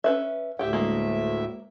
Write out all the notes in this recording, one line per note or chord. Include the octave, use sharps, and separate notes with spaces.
C#4 B4 E5
D2 A2 G4 E5 G5
G#3 A#3